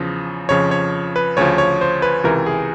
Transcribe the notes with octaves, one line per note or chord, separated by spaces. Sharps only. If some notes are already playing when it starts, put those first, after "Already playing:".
Already playing: E2 C#3 F3
F2 C#3 F3 C#5
C#5
B4
D2 C#3 F3 C#5
C#5
C5
B4
C#2 C3 E3 A#4
G#4